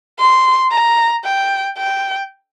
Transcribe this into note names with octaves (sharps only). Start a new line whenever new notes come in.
C6
A#5
G5
G5